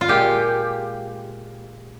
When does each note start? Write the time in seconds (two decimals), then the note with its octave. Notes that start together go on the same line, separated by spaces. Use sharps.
0.01 F4
0.08 A#2 G#3 G4